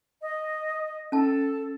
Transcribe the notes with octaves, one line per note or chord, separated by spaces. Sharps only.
D#5
C#4 A4 A5